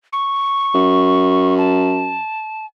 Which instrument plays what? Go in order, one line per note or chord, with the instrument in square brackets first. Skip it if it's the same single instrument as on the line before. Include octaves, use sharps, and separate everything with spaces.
[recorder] C#6
[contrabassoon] F#2
[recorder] A5